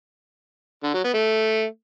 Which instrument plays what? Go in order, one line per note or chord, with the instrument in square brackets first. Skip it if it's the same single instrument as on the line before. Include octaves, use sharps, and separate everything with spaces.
[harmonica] D3
F#3
B3
A3